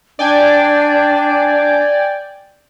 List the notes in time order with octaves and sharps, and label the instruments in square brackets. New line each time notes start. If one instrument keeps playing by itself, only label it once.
[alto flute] D4 [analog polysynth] D5 G5 G#5